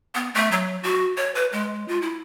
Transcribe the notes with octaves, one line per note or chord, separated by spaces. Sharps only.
B3
A3
F#3
F#4
C#5
B4
G#3
F4
E4